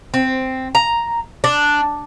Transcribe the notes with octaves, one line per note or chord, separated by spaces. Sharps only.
C4
A#5
D4